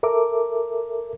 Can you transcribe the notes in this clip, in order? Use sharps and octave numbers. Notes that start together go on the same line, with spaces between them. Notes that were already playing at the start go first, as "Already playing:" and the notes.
A4 A#4 E5 D6